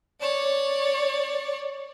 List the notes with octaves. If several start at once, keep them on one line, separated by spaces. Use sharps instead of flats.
C#5 D5